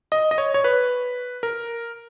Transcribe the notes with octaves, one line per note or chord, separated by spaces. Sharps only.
D#5
D#5
C#5
C#5
B4
A#4